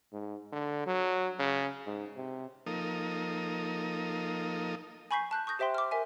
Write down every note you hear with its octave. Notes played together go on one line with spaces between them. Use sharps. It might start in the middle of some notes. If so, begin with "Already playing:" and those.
G#2
D3
F#3
C#3
G#2
C3
F3 A#3 D#4 A4 A#4 D#6
G#5 B5 C#6 G6 B6 C7
A5 F#6 G6
C#6 D#6 G6 A#6
G4 C5 E5 G5 C6
D6 F6
A#4 E5 G#5